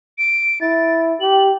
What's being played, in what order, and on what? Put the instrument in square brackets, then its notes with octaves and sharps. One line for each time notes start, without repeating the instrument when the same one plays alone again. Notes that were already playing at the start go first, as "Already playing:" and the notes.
[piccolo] D7
[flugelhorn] E4 [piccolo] A6
[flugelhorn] G4 [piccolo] F#7